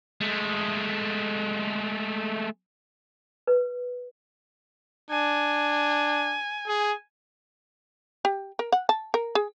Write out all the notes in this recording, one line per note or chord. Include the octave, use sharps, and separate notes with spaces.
G#3 A3
B4
D4 G#5
G#4
G4
A#4
F#5
A5
A#4
G#4